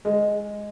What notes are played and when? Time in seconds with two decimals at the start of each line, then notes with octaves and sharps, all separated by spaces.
0.05 G#3